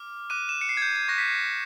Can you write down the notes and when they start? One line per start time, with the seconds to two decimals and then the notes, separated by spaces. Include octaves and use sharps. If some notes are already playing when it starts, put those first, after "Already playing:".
Already playing: D6 F6
0.30 D6 F#6 D#7
0.49 E7
0.61 C#7
0.69 C7
0.77 G#6
0.82 G6
0.96 G#6
1.08 C#6 F#6 A#6
1.18 B6
1.28 C7